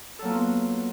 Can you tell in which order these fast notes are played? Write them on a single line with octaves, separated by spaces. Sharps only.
A4 F#3 A#3 B3 F4